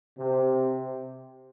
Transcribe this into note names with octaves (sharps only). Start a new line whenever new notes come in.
C3